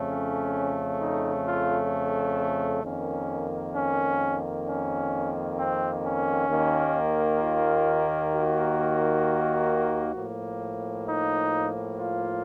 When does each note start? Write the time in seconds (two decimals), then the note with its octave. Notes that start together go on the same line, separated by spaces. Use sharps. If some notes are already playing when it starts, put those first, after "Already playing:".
Already playing: F2 C#3 A3
0.09 C#4
1.00 D#4
1.46 F4
2.83 F2 D#3 A#3 C#4
3.74 C#4
4.66 C#4
5.57 C4
6.03 C#4
6.48 D#2 D#3 A#3
7.40 F4
8.31 F#4
10.14 A2 F3 A#3
11.05 D#4
11.97 F4